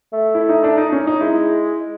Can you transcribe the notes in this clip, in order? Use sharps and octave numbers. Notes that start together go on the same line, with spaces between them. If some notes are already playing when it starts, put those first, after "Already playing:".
A3
E4
D#4
D4
D#4
C#4
D#4
G#3 E4